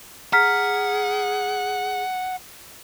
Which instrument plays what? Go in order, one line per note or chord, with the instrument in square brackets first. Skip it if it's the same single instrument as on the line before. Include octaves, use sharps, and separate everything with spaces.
[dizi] G#4 [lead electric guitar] F#5 [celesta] A#5 F6 B6